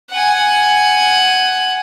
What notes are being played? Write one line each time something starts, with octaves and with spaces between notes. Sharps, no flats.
F#5 G#5